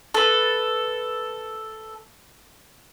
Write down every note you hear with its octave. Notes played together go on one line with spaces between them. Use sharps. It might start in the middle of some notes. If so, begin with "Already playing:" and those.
A4 B4